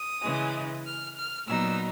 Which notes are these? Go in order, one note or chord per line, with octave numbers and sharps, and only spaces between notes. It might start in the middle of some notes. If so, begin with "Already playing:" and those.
Already playing: D#6
C#3 E3 G#3
F6
F6
A#2 F#3 B3 D#4 E6